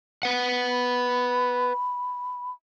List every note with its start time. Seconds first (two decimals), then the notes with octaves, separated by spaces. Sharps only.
0.23 B4 F#5
0.69 B5